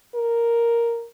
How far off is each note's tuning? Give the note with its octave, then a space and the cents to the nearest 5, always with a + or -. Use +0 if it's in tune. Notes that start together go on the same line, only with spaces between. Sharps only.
A#4 +0